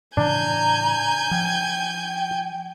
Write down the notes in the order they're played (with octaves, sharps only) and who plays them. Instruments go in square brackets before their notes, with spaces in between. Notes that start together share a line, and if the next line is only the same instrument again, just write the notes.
[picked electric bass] A2 C#3 E3 [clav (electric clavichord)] D4 [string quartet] G#5 G6 G#6 [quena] A#5
[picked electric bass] F3 [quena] G5